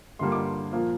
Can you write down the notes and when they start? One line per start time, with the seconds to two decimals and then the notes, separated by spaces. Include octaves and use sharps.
0.19 G2 D3 G3 A#3 C6
0.32 D6
0.44 C6
0.73 A#2 F3 A#3